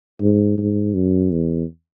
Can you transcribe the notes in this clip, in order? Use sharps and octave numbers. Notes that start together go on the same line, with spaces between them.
G#2
G#2
F#2
E2